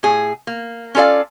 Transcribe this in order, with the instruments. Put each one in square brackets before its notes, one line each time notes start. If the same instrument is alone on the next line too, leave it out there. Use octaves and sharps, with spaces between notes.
[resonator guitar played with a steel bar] A2 G#4
A#3
C#4 F4 A4 D5 F5